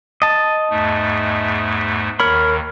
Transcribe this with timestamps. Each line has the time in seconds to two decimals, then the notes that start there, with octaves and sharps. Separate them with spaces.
0.22 D#5 A5
0.70 E2 G#2 A3
2.20 D#2 D#3 A#4 C#5 B5